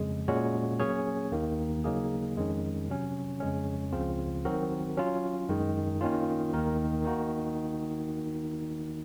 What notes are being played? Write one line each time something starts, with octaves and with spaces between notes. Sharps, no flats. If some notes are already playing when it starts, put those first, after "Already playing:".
Already playing: F2 C#3 G#3
A#2 G#3 C#4 F#4 C#5
F#3 A#3 C#4 G#4 C#5
D#2 D#3 A#3
C#3 F#3 A#3 D#4 G#4
F2 D#3 G#3 C#4
C3 F#3 C#4
F2 C#3 G#3 C#4
C#2 C#3 F3 C4 F4
D#3 F#3 C4 F#4 A#4
F#3 C#4 F4
F#2 D#3 G#3
D#3 A#3 C#4 F4
D#2 D#3 A#3 D#4 A#4
D#3 A#3 D#4 F#4